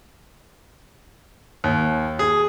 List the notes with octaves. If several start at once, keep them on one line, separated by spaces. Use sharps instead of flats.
D#2
G#4